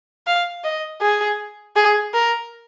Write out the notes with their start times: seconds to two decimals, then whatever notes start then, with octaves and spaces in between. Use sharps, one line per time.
0.27 F5
0.64 D#5
1.01 G#4
1.76 G#4
2.13 A#4